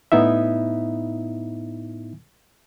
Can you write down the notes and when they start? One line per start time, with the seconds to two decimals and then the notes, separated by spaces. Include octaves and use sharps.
0.12 A2 B3 D#4 E4 E5